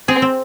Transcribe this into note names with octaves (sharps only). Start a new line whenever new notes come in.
C4 G#4
C4